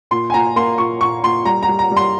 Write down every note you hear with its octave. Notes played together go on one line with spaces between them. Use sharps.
A#2 C6
G#5
A#2 A#5
A#3 C6
A#2 C#6
A#2 C#6
A#2 C6
G3 A#5
A#5
G3
A#5
G3
C6